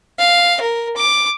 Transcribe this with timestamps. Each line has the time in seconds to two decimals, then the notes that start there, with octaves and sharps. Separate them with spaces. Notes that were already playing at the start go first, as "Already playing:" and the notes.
0.19 F5
0.61 A#4
0.97 D6